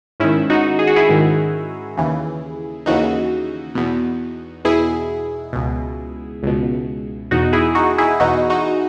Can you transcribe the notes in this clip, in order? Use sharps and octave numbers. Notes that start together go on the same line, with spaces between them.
G#2 D#3 C#4 E4
D#4 F#4
G#4
F#4
E4 G#4
G#2 D#3
D#2 C#3 E3
D#2 C#3 E3 D#4 F#4
E2 B2
E2 B2 E4 G#4
C#2 B2
C#2 B2
E2 B2 D#4 F#4
E4 G#4
D#4 F#4
E4 G#4
E2 B2 D#4 F#4
D#4 F#4